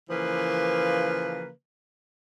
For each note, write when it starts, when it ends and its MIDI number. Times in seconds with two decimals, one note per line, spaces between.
0.10 1.49 49
0.10 1.49 52
0.10 1.49 53
0.10 1.49 58
0.10 1.49 71